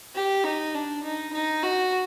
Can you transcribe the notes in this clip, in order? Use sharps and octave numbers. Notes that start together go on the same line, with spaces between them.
G4
D#4
D4
D#4
D#4
F#4